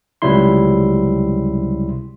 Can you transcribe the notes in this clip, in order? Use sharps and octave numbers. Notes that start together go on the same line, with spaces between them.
C#2 C3 F#3 G3 E4 C6